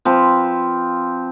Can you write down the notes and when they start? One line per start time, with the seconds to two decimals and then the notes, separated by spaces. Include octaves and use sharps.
0.05 F3 C4 B4